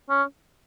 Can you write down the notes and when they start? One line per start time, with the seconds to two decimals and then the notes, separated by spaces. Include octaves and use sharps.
0.10 C#4